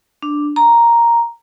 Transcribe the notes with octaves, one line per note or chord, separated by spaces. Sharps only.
D4
A#5